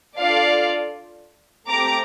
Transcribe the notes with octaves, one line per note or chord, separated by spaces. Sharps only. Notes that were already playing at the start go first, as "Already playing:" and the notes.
D4 F4 A4 D5 F5
A3 C4 G4 A#5 D6